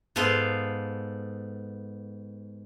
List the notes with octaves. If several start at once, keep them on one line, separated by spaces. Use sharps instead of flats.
G#2 B3 A4 F5 C6